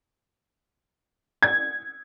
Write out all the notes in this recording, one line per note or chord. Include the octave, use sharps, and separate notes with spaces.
G#6